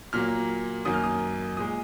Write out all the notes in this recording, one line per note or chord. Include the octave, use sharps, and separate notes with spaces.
A#2 F#3 A#3 F6
F#2 D#3 F#3 A#3 D#6
F6
D#6
A#2 G#3 D#6